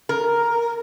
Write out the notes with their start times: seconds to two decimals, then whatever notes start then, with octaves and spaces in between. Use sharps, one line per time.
0.09 A#4